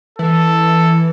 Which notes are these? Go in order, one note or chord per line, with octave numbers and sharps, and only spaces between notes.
E3 A4